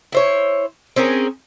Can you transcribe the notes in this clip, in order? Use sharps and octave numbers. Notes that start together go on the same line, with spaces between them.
E4 C5 C#5
C4 C#4 G#4 A#4